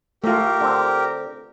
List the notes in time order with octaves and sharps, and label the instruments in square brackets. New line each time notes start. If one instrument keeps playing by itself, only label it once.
[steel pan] A3 F4 [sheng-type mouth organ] G4 A#4
[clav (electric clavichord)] D3 C4